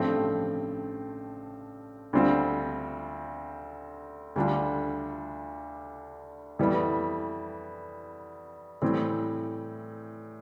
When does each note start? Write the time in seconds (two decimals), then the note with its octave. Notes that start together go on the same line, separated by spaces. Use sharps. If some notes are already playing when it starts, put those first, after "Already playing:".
Already playing: A1 G2 F3 A3 C4
2.13 D2 D3 G3 C4 F4
4.36 D2 D3 G3 D4 F4
6.59 F2 E3 G3 B3 E4
8.82 A2 E3 G3 C4